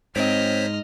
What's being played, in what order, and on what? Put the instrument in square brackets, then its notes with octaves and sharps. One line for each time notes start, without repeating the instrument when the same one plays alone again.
[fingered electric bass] G#2 [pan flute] C4 [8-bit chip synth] C5 C#5 B6 [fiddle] D#5 F6